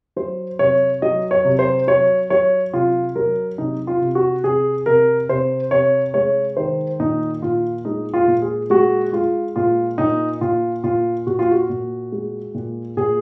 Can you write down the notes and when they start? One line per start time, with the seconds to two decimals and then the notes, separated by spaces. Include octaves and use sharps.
0.16 F#3 C5
0.59 C3 C#5
1.02 F#3 D#5
1.31 C#5
1.45 C3
1.59 C5
1.87 F#3 C#5
2.30 F#3 C#5
2.73 C3 F4
3.16 F#3 A#4
3.58 C3 D#4
3.87 F4
4.01 C3
4.15 F#4
4.44 C3 G#4
4.86 C3 A#4
5.29 C3 C5
5.71 C3 C#5
6.14 G#3 C#5
6.57 D#3 C5
7.00 A#2 D#4
7.42 A#2 F4
7.85 G#3 D#4
8.14 F4
8.28 A#2
8.42 G#4
8.70 G#3 F#4
9.13 G#3 F4
9.56 A#2 F4
9.98 A#2 D#4
10.41 A#2 F4
10.84 A#2 F4
11.27 A#2 F#4
11.39 F4
11.51 F#4
11.69 A#2
12.12 G#3
12.54 A#2
12.97 A#2 G#4